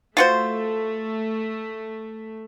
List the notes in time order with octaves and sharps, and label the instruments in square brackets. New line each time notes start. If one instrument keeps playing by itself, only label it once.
[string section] A3 [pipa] F4 F#4 C5